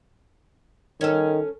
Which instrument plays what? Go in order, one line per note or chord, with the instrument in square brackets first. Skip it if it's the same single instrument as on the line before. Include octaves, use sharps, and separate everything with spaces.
[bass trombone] D#3 [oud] C#4 A4